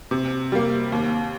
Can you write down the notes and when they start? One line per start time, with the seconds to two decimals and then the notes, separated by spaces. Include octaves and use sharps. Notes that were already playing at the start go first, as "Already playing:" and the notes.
0.11 C3
0.52 G3 A#3
0.92 D#2